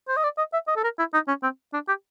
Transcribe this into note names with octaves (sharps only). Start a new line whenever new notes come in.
C5
D#5
D5
D#5
E5
D#5
A4
A#4
E4
D#4
C#4
C4
D4
G4